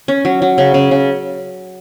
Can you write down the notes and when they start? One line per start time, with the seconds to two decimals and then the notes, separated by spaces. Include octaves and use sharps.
0.08 C#4
0.25 F#3
0.42 F#3
0.58 C#3
0.74 C#3
0.91 C#3